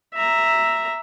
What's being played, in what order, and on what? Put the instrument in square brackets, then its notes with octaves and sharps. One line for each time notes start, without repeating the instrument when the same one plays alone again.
[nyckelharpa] E5 A#5